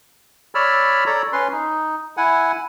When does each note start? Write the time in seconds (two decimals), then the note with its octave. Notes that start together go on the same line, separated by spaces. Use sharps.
0.55 C#5 D5 B5 E6 F6
1.06 A4 C#5 D5 A#5
1.33 C#4 B4 C6
1.52 D#4
2.17 E4 F#5 G#5